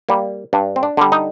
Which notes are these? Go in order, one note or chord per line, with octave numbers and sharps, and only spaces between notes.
G3 A#3
G2 D4
C4
D4
D3 G3
D#4